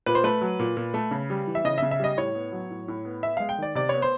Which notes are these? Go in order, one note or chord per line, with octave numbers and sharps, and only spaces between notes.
A#2 B4
C5
A3 B4
F#3
A#2
A#2
A3
C#3
G3
E3
E5
C#3 D#5
E5
C#3
E5
G3 D#5
A2 C#5
B3
F#3
A2
A2
B3
B3 E5
G#3 F5
G5
D#3 D5
C3 D5
B3 C#5
C5